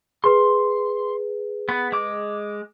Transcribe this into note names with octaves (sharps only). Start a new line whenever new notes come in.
G#4 B4 C6
B3
G#3 D6